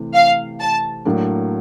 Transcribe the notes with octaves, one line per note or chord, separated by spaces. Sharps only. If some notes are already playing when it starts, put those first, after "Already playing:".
Already playing: C3 E3 A3
F5
A5
A2 F#3 A#3 D4